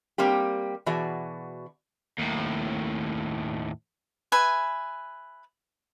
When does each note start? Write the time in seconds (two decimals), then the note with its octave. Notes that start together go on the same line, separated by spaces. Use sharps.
0.18 G3 A#3 C4 G4
0.86 B2 E3 F#4 G#4 D5
2.19 D#2 A2
4.32 B4 E5 G#5